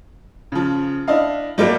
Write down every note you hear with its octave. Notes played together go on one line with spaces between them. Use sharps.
C#3 F3
D4 E4 D#5 F5
F#3 G3 A3 A#3